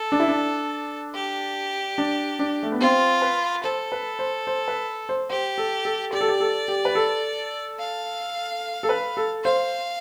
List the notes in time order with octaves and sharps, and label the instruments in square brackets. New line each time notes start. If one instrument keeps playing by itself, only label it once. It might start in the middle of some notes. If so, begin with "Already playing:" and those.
Already playing: [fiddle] A4
[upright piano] D4
E4
D4
[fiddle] G4
[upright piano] D4
D4
A3
B3
[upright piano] C4 [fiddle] F4
[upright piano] B4
[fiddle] A4 [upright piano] C5
[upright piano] B4
C5
C5
B4
C5
[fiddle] G4 [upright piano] C5
[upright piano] A4
A4
[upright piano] G4 [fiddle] D5
[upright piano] A4
G4
A4
G4
B4
A4
[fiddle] F5
[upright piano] A4
B4
A4
[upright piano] C5 [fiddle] F5